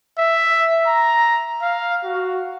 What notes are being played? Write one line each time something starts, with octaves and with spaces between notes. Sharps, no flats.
E5
A#5
F5
F#4